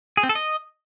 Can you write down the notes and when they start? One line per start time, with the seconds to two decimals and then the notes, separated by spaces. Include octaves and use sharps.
0.17 G#4
0.23 C4
0.29 A4
0.35 D#5